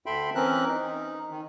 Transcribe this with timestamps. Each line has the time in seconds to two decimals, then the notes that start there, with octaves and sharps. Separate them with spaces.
0.06 D2 A4 E5 G5 B5 C6
0.35 E3 C4 C#4 A#4 F#6
0.68 D#4
1.30 D#3